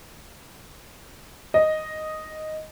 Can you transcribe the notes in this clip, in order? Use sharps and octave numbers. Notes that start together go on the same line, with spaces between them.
D#5